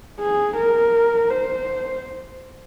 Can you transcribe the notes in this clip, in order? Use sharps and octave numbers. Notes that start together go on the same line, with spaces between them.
G#4
A#4
C5